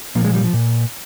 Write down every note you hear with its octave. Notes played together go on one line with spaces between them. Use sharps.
A#2 F3 A#3
G#3
G3
F3
A#2